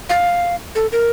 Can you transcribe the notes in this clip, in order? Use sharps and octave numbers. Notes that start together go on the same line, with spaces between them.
F5
A4
A#4